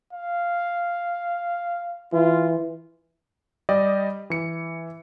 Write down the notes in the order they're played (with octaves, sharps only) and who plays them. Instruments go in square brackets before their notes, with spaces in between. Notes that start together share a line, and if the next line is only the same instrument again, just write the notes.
[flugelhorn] F5
[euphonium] E3 [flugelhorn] F4
[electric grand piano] G3 G4 D5 D#5
E3 C#7